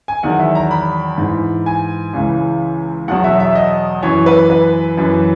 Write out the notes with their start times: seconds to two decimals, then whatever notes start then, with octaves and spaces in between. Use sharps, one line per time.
0.08 G#5
0.23 E2 D#3 F#3 F#5
0.39 E5
0.55 A#5
0.71 B5
1.18 G#2 E3
1.66 G#5
2.13 C#2 C#3 E3
3.08 E2 B2 F#3 F#5
3.24 E5
3.40 E5
3.55 D#5
4.02 F#2 E3 C#5
4.26 B4
4.50 B4
4.97 F#2 E3